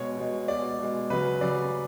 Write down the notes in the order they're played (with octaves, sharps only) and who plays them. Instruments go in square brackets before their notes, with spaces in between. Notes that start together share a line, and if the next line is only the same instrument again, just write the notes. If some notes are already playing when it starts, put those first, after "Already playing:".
Already playing: [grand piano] B2 G#3 C#5
B2 G#3
B2 G#3 D5
B2 G#3
C#3 F#3 B4
C#3 F#3 D5